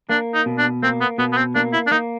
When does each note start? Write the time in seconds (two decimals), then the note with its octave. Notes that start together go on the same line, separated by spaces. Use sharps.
0.09 A#3 D4
0.34 D#4
0.46 B2
0.58 D4
0.83 A#3 C4
1.01 B3
1.18 B2 B3
1.33 B3
1.37 C4
1.55 A#3 D4
1.73 E4
1.87 D4
1.91 A#3 D#4